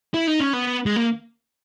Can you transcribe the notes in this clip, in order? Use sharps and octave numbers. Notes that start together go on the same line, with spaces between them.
E4
D#4
C#4
B3
G#3
A#3